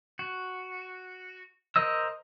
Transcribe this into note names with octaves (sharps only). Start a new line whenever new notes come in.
F#4
A#4 C5 D#5 E6